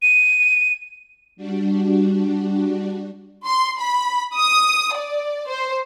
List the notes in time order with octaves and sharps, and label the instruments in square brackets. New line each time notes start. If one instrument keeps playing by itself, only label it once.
[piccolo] D#7
[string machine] G3 D4 F#4
[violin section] C6
B5
D#6
D5
C5